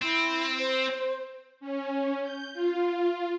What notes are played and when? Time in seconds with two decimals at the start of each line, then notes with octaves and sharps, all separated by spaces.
0.02 C4 E4
0.58 C5
1.60 C#4
2.22 G6
2.54 F4